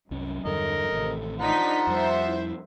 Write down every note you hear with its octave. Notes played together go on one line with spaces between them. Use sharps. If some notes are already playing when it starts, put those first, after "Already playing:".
C2 F#2 C#4
E2 G2 D3 A4 A#4 D#5
A1 A2 C3 D#3
F3 D4 D#4 F#5 A#5 C6 B6
F2 G3 C5 E5
E4